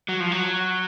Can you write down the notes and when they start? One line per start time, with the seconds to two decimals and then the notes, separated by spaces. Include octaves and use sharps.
0.09 F#3
0.20 F3
0.32 F#3